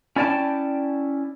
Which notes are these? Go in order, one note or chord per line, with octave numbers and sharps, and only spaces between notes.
C#4 E4 D5 G5 A5